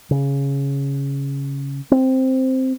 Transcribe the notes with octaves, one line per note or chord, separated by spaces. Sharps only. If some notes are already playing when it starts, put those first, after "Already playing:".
C#3
C4